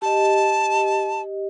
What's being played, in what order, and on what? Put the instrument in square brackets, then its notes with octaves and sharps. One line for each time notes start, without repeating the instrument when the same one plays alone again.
[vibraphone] G4 D#5 [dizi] A5